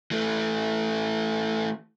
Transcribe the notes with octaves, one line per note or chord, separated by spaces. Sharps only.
E3 A3